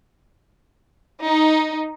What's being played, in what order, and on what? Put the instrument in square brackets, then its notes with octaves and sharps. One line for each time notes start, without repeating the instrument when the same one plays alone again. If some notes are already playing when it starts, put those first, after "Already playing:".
[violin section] D#4